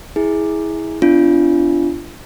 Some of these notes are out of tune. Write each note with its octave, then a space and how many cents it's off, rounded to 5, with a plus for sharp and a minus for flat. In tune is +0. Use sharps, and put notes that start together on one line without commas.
E4 -20 G#4 +0
B3 +40 D4 +0 F4 -30